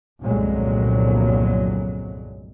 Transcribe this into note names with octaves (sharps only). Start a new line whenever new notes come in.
G1 C2 F2 A#2 F#3 G#3